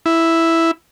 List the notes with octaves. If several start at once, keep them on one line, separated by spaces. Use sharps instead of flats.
E4